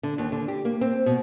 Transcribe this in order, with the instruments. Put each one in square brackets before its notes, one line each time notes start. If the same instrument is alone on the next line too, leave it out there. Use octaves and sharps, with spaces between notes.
[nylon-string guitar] D3
D#2
D3
G4
A#3
C4
B2